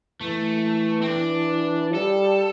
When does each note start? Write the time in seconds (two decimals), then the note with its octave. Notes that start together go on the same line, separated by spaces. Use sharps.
0.21 E3 A3
1.02 C4
1.08 D4
1.94 G3 A4